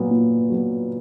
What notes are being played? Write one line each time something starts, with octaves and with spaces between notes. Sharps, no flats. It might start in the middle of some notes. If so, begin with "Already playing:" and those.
Already playing: A#2 F#3 B3
A#2
F#3 B3